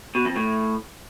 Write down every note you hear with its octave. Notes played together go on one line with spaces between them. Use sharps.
B2
F2
A2